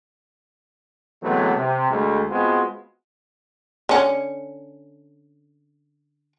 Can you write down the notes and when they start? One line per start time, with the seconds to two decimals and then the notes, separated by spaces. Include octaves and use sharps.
1.22 C3 E3 F#3 G#3 A3 B3
1.55 C3
1.89 D2 G#3 A3
2.30 G#3 B3 C4 F4 F#4
3.89 D3 C#4